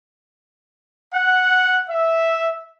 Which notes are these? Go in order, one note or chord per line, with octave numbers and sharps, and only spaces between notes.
F#5
E5